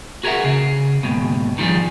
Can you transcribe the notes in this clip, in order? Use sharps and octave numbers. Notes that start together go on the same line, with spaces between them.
F#4 G#4 A#4 C5 E5 F#5
C#3 G#4
D#2 G#2 B2
D#3 F3 G3 F4 G#4